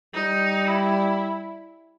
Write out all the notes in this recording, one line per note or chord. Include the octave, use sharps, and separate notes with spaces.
G3 D#4
E4